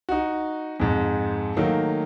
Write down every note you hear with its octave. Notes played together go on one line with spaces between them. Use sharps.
D#4 F#4
F2 G#2
D#3 F#3 A3 A#3